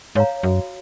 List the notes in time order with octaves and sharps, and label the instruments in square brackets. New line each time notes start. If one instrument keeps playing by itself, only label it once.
[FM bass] G#2 [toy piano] C#5 F5 A#5
[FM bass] F#2 [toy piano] F#4